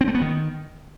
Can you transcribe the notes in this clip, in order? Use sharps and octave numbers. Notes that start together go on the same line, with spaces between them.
C4
A3
B3
D#3